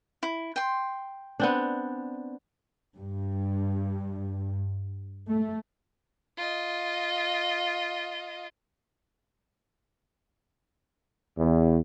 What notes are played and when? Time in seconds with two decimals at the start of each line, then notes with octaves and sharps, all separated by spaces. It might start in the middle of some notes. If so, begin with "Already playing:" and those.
0.23 E4
0.56 G5 C6
1.40 B3 C4 D4
2.96 G2
5.29 A3
6.37 F4 D#5
11.38 E2